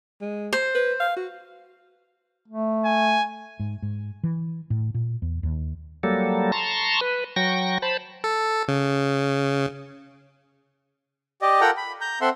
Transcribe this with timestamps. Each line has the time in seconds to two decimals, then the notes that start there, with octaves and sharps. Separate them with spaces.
0.21 G#3
0.53 C5
0.75 B4
1.00 F5
1.17 F#4
2.48 A3
2.85 G#5
3.60 G#2
3.82 G#2
4.23 E3
4.70 A2
4.94 A#2
5.22 E2
5.43 D#2
6.03 F#3 G3 A#3 A4
6.52 A5 A#5 C6 C#6
7.01 B4
7.36 F#3 G5 C#6 A#6
7.82 C5 A5 B5
8.24 A4
8.68 C#3
11.42 G4 D5 D#5
11.61 F4 A4 A#4 F#5 G5 A#5
11.77 B5
12.01 A#5 G6
12.21 C4 A4 E5 F#5 C6